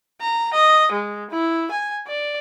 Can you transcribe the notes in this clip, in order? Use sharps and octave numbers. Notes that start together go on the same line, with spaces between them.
A#5
D#5
G#3
E4
G#5
D5